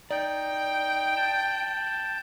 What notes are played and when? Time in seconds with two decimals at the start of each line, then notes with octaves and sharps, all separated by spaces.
0.11 D#4 D5 G5
1.17 A5 G6